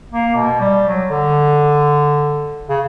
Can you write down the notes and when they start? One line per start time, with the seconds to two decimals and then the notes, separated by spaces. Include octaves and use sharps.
0.12 A#3
0.35 B2
0.60 G3
0.88 F#3
1.10 D3
2.69 C#3